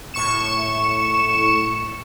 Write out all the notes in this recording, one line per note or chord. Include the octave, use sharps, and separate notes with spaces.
A2 C#6 C#7 E7